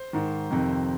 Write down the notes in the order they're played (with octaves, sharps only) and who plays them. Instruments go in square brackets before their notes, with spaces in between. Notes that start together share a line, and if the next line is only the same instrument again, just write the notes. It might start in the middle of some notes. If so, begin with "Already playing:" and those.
Already playing: [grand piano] C5
G#2 D#3
F2 C3 D#3